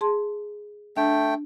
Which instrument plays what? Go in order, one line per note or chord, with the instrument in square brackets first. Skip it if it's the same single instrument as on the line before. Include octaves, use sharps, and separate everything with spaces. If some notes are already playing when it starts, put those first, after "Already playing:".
[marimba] G#4 A5 C6
[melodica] A3 G5 [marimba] D4